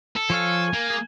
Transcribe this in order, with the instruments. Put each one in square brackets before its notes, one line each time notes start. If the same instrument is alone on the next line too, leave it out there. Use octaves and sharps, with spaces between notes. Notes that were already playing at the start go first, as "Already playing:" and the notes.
[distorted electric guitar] A4
[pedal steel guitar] F3 C#5 F5 [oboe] G#5
[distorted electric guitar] A#3
[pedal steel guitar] G#4